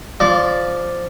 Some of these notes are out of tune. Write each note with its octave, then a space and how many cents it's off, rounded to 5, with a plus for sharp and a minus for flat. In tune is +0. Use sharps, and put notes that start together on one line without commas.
F3 +0 D5 +0 D6 -35